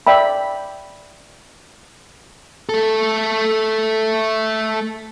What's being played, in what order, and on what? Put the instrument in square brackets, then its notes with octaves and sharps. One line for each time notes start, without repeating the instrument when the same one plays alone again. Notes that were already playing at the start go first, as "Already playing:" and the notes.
[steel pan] D5 E5 G5 B5
[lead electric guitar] A3 A4